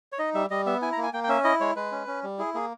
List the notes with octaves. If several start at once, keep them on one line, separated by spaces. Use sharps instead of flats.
C#5
D#4 D#5
G3 E5
G3 D#5
B3 E5
E4 G#5
A#5
A#3
G#5
A#3 G5
G5
C#4 E5
E4 D#5
G#3 C#5
G#3 B4
C#4
C#4
G3
E4 G#4
A#3 G#4